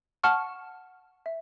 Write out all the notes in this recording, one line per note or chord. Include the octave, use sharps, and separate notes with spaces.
F#5 A5 C#6 F6
E5